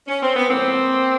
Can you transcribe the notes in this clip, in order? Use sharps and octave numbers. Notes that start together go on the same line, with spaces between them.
C#4
C4
B3
A2 F3 G#3 A#3 C4